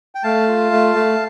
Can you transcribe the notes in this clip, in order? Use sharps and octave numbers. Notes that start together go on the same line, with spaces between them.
G5
A3 F5 A5
F4
A3
A3